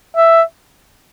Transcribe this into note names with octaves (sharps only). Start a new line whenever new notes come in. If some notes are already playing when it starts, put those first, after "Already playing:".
E5